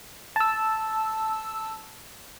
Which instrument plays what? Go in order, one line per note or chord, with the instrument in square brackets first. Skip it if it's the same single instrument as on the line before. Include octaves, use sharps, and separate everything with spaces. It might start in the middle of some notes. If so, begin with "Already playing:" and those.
[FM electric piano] A5 E6